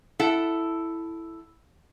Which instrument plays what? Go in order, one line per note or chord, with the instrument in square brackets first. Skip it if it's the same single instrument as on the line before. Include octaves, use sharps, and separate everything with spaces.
[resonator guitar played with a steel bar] E4 A4 F#5